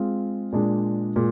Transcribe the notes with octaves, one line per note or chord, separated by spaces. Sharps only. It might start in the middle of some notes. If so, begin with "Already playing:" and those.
Already playing: G#3 C4 F4
A#2 G#3 D4
A#2 G#3